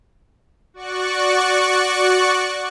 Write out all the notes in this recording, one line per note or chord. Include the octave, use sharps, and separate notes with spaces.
F#4 D5 C#6 F#6